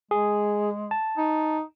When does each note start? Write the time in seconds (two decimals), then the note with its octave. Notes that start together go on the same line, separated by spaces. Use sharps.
0.11 G#3 G#4
0.91 A5
1.17 D#4